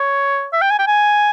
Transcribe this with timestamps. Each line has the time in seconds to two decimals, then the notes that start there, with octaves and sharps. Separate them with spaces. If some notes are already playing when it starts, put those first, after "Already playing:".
Already playing: C#5
0.53 E5
0.62 G5
0.70 G#5
0.79 G5
0.87 G#5